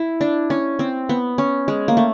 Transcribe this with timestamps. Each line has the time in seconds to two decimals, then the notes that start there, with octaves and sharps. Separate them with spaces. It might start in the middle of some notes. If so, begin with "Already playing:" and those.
Already playing: E4
0.21 D4
0.50 C#4
0.79 C4
1.09 B3
1.38 C#4
1.68 G#3
1.88 A#3
1.97 A3